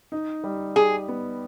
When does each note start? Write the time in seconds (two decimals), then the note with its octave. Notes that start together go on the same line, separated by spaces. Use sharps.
0.12 D#4
0.44 G3
0.76 G4 G#4
1.08 B3